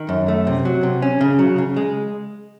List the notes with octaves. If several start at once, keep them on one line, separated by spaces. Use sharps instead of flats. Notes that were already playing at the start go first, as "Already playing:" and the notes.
Already playing: D#3
F#2
A3
C3
F#3
C3
C#4
C#3
F#3
C#3
G#3